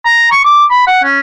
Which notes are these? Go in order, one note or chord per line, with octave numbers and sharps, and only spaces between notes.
A#5
C#6
D6
B5
F#5
C#4